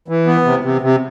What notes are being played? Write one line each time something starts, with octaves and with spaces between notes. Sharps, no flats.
E3
B3
C3
C3
C3